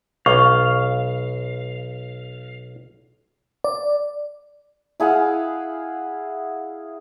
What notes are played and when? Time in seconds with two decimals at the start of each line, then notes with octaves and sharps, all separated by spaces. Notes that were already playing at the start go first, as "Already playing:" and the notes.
0.26 B1 F5 C#6
3.64 D5
5.00 E4 G#4 F5 F#5